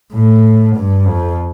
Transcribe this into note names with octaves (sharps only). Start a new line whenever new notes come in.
A2
G2
F2